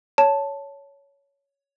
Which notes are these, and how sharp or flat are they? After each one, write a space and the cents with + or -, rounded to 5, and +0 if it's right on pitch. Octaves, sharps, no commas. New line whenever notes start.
C#5 +10 A5 +0